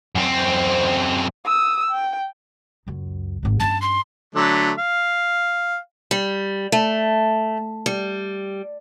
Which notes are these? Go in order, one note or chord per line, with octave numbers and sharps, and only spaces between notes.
F#2 C4
D#6 E6
G5
C#2 F#2
G#1 G#2
G2 C#4 A5
C6
D3 F#3 A3
F5
G3
A3
G3